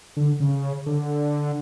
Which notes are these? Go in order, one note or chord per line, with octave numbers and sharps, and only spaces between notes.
D3
C#3
D3